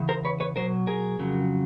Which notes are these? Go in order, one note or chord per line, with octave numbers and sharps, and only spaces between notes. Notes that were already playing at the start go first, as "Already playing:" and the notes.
Already playing: E2 C#3
A#4 C5
B4 C#5
B4 C#5
B2 F#3 A#4 C5
G#4 A#4
F2 C#3 F#3